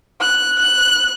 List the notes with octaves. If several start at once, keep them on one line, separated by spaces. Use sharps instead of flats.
F#6
F#6